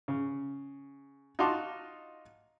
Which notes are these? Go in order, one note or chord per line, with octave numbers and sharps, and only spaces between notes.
C#3
D#4 F4 F#4 A5 C6 D6